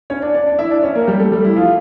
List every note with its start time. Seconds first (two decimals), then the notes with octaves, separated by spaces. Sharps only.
0.10 C#4 C#5
0.22 D4 D5
0.34 D4 D5
0.47 D4 D5
0.59 E4 E5
0.71 D4 D5
0.83 C#4 C#5
0.95 A#3 A#4
1.07 G3 G4
1.20 A3 A4
1.32 G3 G4
1.44 E4
1.56 F3 F4